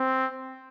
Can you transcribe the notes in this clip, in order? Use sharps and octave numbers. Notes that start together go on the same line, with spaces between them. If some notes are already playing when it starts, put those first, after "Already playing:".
Already playing: C4